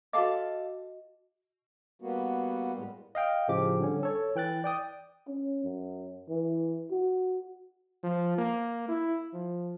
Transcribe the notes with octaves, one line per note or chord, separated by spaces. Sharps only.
F#4 A4 D#5 F5 D6
G3 A#3 B3 F#4
A2 G3 G#3
D#5 F5 G5
A2 C#3 F3 G4 D6
D3 G3 C#4
A4 C#5
E3 G5 F#6 A6
D5 G5 D#6
C#4
F#2
E3
F#4
F3
A#3
E4
F3